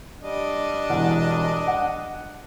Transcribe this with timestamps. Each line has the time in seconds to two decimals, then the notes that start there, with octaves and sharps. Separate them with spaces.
0.21 G3 D4 D#5
0.90 E1 E2 F#5
1.68 F#5